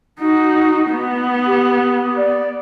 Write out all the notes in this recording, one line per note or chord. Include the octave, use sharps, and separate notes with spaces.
D#4 F#4
B3
G4
D5